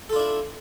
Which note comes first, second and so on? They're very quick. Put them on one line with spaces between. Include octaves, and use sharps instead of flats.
A4 F4 D4 E4